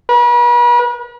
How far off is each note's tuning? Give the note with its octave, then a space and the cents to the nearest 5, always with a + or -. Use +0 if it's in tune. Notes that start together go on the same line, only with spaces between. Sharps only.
B4 -40